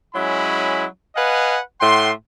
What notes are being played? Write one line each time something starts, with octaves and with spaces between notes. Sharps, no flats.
F#3 G#3 C#4 E4 B5
B4 D#5 F5 F#5 G#5
A2 F#5 G5 C6